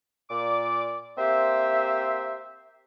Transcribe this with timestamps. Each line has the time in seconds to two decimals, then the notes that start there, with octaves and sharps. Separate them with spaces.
0.30 A#2 D5 D6
1.17 A#3 C4 G4 C5 E5